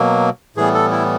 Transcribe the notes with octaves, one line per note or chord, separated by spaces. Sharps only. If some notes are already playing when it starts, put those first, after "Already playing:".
Already playing: B2 F#3 A#3
A2 E3 G3 B3 G#4
A4
E4